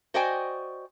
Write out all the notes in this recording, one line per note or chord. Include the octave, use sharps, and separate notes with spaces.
F#4 C5 D5 D#5 G5 G#5